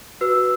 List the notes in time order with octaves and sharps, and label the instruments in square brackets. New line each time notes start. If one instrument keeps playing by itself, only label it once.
[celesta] F#4 B4 E6